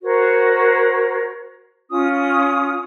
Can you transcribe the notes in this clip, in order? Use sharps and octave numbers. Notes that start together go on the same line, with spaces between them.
F#4 A#4 C5 C#5
C#4 F4 D#6